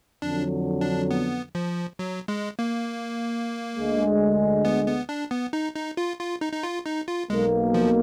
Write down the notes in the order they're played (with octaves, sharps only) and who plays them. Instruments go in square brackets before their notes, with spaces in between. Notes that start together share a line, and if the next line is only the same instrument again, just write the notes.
[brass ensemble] F2 D3 F#3 [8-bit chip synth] D4
[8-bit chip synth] D4
B3
F3
F#3
G#3
A#3
[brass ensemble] D2 D3 G#3
[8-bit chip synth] B3
B3
D4
B3
D#4
D#4
F4
F4
D#4
D#4
F4
D#4
F4
[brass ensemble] B1 B2 A#3 [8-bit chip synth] G#3
[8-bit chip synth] F3